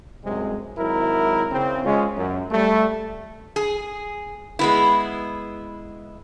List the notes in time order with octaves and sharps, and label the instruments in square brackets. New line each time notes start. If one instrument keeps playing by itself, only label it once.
[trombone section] C2 F#2 C3 G#3
G#1 F#3 E4 A#4
C#3 C4
G#3 C#4 F4 G#4
F#2
G3 A3
[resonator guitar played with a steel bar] G#4
G#3 B3 E4